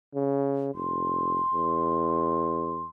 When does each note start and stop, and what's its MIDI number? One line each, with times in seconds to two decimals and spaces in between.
0.15 0.70 49
0.74 1.40 29
0.74 2.84 84
1.53 2.87 40